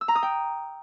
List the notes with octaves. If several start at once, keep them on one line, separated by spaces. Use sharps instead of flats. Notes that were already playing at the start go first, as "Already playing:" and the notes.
E6
A#5
D#6
G5